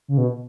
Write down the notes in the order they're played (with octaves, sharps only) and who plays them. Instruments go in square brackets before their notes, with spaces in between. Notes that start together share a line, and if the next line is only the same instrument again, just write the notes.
[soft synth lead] C#3
B2